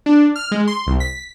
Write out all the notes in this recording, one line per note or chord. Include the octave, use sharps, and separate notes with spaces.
D4
F6
G#3
C6
C2
B6